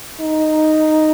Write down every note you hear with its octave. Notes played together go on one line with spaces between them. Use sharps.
D#4